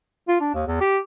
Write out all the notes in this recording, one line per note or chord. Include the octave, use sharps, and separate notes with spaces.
F4
D4
D#2
E2
G4